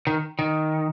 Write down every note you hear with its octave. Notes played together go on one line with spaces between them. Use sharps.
D#3
D#3